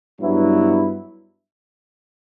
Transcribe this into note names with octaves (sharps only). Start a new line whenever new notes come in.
G2 F#3 B3 E4